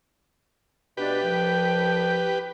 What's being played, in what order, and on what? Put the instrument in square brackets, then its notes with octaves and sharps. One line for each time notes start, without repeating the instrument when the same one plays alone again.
[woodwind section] B2 A3 D4 [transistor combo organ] G4 B4
[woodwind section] C2 F3 G5